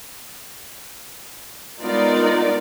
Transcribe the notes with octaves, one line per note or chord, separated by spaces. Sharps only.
G#3 B3 D#4 F4 A#4 D5